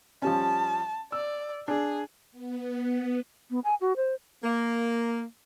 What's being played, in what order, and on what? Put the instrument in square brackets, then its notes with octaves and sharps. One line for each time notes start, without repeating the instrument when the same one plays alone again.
[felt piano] F3 G3 C#4 [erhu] A5
[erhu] D5 [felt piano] E6
[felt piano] D4 [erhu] G#4
[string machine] B3
[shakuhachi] B3
G#5
F#4
C5
[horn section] A#3